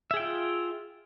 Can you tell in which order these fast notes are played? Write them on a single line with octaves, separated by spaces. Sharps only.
E5 G#4 G5 F4